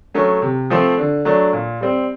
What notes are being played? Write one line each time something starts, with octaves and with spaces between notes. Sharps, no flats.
F#3 A3 C#4
C3
F3 A3 C4
D3
F#3 A3 D4
A#2
G3 C4